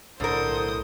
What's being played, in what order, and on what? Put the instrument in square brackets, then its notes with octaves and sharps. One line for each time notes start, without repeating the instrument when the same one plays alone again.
[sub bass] B1 [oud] A2 [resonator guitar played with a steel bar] D3 A#4 [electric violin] C5 D#6